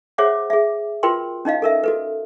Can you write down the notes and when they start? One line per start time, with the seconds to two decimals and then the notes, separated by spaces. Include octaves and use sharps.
0.18 G#4 C5 C#5 E5 F#5 D6
0.50 G#4 E5
1.03 F4 F#4 A#4 B4 G5 C6
1.45 C#4 D#4 D#5 F5
1.62 A4 A#4 E5
1.84 F#4 A4 B4